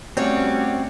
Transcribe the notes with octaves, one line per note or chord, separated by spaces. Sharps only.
G3 A3 C4 C#4 F#4 C#5 D5